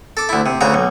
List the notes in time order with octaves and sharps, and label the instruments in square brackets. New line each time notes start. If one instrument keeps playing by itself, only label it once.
[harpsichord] A4 D6
D2 E4
C3
D2 C#3 F#4 A#5
B1